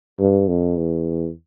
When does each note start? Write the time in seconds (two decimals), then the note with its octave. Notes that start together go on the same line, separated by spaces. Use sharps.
0.19 G2
0.48 F2
0.77 E2